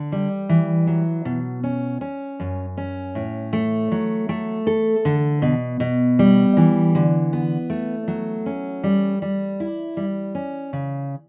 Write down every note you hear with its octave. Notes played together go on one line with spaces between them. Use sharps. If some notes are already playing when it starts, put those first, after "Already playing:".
Already playing: D3
G3
E3
F#3
B2
C#4
C#4
F#2
C#4
A2
A3
F#3
A3
A4
D3
B2
B2
G3
E3
D3
B3
A3
F#3
C#4
G3
G3
E4
G3
C#4
C#3